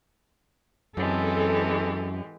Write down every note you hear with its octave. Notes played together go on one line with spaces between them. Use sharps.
F#2 E3 G#3 C4 G4 A4